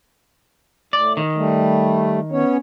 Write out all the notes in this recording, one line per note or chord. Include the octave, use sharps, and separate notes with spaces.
A2 D5
D#3
G3 A3
B3 C#4 C#5